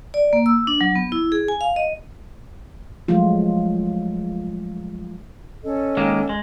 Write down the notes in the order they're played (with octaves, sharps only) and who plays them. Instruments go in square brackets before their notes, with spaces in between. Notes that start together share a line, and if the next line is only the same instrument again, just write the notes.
[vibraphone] D5
A#3
E6
D4
F#3
B3
E4
G#4
G#5
F5
D#5
[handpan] F3 F#3 G#3 A3 F4
[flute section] C#4 A4 D#5
[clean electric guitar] D#3 G#3 A#3
G#3